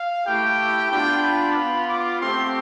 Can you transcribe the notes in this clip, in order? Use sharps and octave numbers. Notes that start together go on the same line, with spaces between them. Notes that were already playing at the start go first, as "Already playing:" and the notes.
Already playing: F5
A3 E4 G4 G5
B3 D4 F4 G5
B5
B3 F4
D6
A3 C4 G4 C6